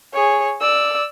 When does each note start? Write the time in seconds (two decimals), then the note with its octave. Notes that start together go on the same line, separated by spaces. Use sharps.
0.13 G#4 C#5
0.61 D5 E6